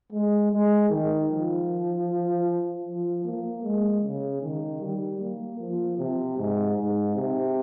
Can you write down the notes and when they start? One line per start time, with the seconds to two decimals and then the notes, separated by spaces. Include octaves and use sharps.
0.12 G#3
0.51 G#3
0.90 D#3
1.30 F3
2.85 F3
3.25 A#3
3.63 G#3
4.03 C#3
4.42 D#3
4.81 G3
5.21 A#3
5.59 F3
5.98 C3
6.38 G#2
6.76 G#2
7.16 C3